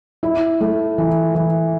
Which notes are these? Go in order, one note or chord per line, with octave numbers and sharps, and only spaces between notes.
E4
A3
E3
E3